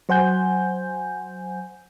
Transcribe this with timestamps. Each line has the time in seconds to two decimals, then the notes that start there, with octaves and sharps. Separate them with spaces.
0.09 F#3 C5 F#5 G#5 G6